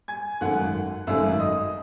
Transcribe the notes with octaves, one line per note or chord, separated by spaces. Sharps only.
G#5 G#6
G#1 F#2 D#3 A3 F#5 F#6
G#1 F#2 D#3 A3 E5 E6
D#5 D#6